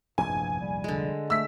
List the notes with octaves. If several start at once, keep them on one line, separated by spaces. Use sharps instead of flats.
F1 A#1 E2 G2 G#5
G3
D3 G#3
A3 E6 B6